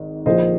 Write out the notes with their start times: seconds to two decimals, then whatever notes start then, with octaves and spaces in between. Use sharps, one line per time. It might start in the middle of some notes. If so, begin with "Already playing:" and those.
Already playing: G#1 G#2 D#3
0.26 A#1 A#2 F3 C5 D#5